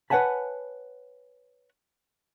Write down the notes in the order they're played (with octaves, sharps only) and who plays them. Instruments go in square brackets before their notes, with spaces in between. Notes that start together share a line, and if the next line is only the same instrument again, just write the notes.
[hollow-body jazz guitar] B4 C#5 F#5 G#5 A5 B5